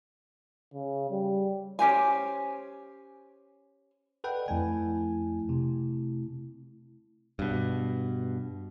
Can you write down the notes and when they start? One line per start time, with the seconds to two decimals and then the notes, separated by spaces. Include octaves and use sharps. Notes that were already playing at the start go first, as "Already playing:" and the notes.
0.74 C#3
1.10 G3
1.79 C#4 G4 C5 G#5
4.24 A4 B4 D5 D#5 F#5 G5
4.48 F2 A3 E4 G#5
5.49 C3
7.39 G2 B2